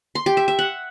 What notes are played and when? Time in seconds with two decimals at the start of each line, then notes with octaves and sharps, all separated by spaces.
0.15 C6
0.26 G4
0.37 E5
0.48 E5
0.59 F#5